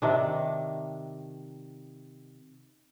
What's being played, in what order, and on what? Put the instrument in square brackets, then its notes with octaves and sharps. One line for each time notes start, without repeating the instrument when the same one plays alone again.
[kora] C3 D#3 D4